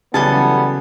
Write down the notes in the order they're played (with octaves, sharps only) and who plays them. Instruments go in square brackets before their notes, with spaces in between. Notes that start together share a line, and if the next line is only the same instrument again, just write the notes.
[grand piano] C#3 F#3 [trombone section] E3 G3 B3 [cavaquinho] A4 G#5 A5